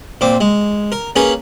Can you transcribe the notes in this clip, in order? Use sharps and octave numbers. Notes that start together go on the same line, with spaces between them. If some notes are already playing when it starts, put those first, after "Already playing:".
A#2 C4 D6
G#3
A#4
A#3 C#4 G#4 B4 G#5